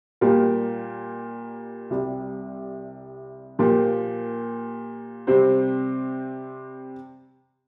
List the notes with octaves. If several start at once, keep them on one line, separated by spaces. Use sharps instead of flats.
A#2 G3 A#3 G4 A#4
C2 C3 G3
A#2 F3 A#3 G4
C3 G3 C4 G4 C5